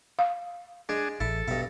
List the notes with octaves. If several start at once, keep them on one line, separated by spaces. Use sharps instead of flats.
F5
G#3 D4 G#4
A1 E4 A4
G2 B2 E4